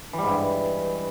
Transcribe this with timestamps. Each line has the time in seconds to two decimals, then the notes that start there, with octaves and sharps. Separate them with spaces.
0.13 E3
0.18 G3
0.23 G#2
0.28 G2